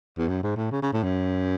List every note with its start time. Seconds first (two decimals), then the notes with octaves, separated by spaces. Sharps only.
0.17 E2
0.28 F#2
0.42 G#2
0.56 A2
0.71 C#3
0.82 C#3
0.92 A2
1.03 F#2